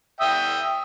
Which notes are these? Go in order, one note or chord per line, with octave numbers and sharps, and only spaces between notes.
E5 G5 D#6